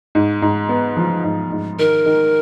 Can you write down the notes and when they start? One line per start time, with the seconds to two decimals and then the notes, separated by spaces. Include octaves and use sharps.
0.15 G#2
0.42 G#2
0.69 B3
0.97 F3
1.24 G#2
1.52 G#2
1.79 D#3 A#4
2.06 D#3